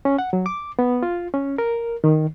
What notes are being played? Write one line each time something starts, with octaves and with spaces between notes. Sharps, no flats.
C#4
F#5
F#3
D6
B3
F4
C#4
A#4
D#3